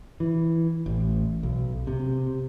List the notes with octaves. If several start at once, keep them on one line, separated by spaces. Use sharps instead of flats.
E3
A1
B1
C3